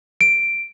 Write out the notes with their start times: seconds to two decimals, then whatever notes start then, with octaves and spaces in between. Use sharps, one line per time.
0.21 D7